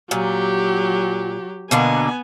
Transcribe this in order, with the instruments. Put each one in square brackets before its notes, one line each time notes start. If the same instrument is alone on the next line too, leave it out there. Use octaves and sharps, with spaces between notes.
[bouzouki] A#2 [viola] F#3 G4
[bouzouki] B2 D3 A#3 [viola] B3 G#5